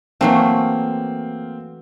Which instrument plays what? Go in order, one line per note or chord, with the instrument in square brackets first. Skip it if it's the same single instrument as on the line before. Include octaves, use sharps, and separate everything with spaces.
[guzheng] E3 F#3 A3 [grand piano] A#3 C4 F5